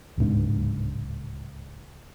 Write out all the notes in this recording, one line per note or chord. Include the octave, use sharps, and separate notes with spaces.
D1 C#2 G#2 D4